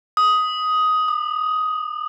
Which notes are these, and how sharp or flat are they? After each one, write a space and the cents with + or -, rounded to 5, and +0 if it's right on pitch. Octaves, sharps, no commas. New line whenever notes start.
D#6 +10
D#6 -45